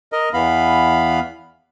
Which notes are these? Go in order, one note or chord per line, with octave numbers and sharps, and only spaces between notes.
A#4 D#5
E2 E3 B3 F5 B5